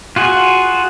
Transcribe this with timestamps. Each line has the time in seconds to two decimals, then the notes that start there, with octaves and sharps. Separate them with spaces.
0.16 F4 F#4 G#4